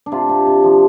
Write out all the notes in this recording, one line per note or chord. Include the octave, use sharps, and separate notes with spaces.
D4
C3 F4
C3
C3
F3